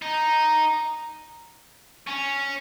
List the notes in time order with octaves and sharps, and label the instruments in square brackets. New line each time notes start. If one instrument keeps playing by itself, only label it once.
[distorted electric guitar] D#4
C#4